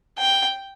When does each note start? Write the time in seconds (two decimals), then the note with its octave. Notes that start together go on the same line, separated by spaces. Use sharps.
0.18 G5